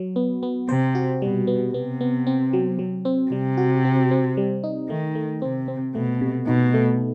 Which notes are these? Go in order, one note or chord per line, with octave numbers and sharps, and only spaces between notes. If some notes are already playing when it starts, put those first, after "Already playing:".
Already playing: F#3
B3
B3
C3 C5
F#4
B2 G3
B3
C3 B3
B3
C4
F#3
F#3
C4
C3 G3
F#4
C4
C4
G3
D#4
D#3 A3
A3
C3 C4
C4
B2 A3
C3
B2 D#4
A3